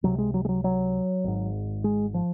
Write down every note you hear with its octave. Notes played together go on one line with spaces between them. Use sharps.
C#2 C3 F#3
G#3
F#3
G#3
F#3
F#3
G#1 G#2
G#3
F3